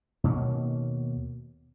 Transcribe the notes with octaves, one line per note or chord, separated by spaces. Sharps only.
D#2 B2 A#3 C#4